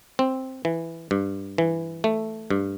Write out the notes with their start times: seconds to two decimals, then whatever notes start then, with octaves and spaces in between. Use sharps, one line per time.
0.19 C4
0.65 E3
1.11 G2
1.58 E3
2.04 A3
2.50 G2